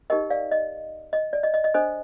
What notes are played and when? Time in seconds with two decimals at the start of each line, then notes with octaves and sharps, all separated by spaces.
0.10 D#4 G4 A#4 D#5 G5
0.30 D5 F5
0.51 D#5
1.13 D#5
1.33 D5
1.43 D#5
1.54 D#5
1.64 D#5
1.74 D4 A4 C5 D#5